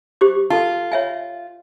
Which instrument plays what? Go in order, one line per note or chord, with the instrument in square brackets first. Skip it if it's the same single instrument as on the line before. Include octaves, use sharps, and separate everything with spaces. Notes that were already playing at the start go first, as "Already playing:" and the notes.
[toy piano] G4 C5 D6
[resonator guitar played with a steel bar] F4 [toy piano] A4 A5
[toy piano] C#5 E5 G#5